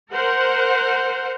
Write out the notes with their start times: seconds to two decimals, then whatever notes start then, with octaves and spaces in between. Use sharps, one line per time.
0.11 A#4 C5 F#5